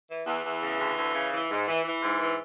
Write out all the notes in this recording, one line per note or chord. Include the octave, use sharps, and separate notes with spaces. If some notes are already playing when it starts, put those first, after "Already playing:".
E3
E2 E3
E2
C#3
D2
D2
C#3
E3
G#2
E3
E3
G#2
E3